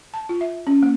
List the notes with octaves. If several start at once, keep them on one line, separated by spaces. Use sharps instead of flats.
A5
F4
E5
C#4
A#3